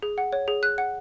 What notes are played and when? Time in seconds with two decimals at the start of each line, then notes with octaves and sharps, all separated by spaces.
0.03 G#4
0.18 F#5
0.32 C#5
0.48 G#4
0.63 F#6
0.78 F#5